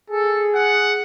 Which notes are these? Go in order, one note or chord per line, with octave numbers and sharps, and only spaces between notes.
G#4 A4
F#5